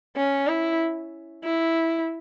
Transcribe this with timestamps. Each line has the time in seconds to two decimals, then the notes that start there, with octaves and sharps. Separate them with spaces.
0.16 C#4
0.48 E4
1.44 E4